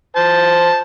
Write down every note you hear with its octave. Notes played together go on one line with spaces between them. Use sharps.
C5 A5